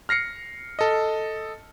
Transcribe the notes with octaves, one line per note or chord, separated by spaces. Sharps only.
F6 A#6 C7 C#7
A4 D#5